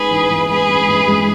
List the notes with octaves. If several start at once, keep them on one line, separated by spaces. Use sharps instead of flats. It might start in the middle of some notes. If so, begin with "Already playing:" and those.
Already playing: G#3 D#4 G#4 B4
E3
E3
G#3 G#4 B4
G#3
E3
G#3